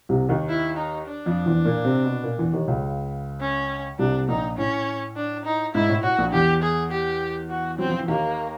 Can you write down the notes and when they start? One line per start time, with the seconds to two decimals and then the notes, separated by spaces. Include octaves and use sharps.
0.09 C2 C3
0.29 D#2 D#3
0.49 E4
0.77 D#4
1.06 D4
1.26 F2 F3
1.46 E2 E3
1.65 A#2 A#3
1.85 C3 C4
2.05 B2 B3
2.23 A#2 A#3
2.39 E2 E3
2.53 D#2 D#3
2.68 C#2 C#3
3.41 C#4
3.99 C2 C3 D4
4.28 A#1 A#2 D#4
4.58 A2 C#4
5.16 D4
5.45 D#4
5.75 G#2 E4
5.89 A2
6.03 A2 F#4
6.18 A#1 A#2
6.32 E2 E3 G4
6.62 G#4
6.91 G4
7.50 F#4
7.79 F#3 C4
7.89 F3
7.99 E3
8.08 D#2 D#3 A#3